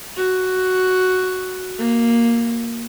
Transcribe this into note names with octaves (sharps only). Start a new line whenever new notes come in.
F#4
A#3